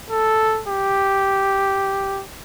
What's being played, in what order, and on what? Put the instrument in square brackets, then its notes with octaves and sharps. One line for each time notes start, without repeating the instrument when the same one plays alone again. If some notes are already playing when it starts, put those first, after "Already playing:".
[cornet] A4
G4